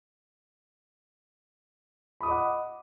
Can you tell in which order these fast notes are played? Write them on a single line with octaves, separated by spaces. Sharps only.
B5 D#6 D6 D#5 F#5